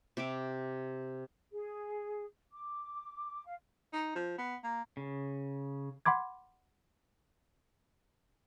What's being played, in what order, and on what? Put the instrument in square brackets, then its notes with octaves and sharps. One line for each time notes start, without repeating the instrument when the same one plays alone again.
[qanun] C3 G4 E5 D6
[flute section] G#4
D6
F5
[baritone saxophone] D#4
F3
B3
A#3
[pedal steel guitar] C#3
[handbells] F#5 B5 C6 D6 G#6